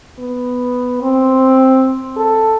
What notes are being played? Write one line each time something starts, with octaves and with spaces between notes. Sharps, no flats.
B3
C4
A4